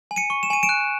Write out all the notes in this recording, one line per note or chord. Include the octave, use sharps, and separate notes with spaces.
G#5
C#7 D#7
C#6
E7
G#5 D#7
D7 E7
F#6